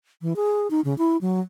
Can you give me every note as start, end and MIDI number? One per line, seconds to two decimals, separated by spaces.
0.22 0.36 52
0.36 0.68 68
0.70 0.81 63
0.84 0.96 49
0.98 1.17 64
1.21 1.40 54